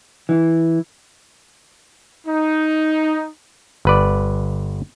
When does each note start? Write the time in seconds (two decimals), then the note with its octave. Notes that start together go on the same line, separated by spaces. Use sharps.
0.29 E3
2.26 D#4
3.85 G1 B4 D5